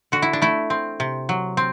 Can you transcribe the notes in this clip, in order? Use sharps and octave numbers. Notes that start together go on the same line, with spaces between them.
D3 F#4
E4
D4
A3 E4
C4
C3
F#3
C4